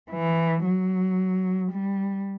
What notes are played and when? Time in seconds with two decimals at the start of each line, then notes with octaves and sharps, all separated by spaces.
0.11 E3
0.65 F#3
1.72 G3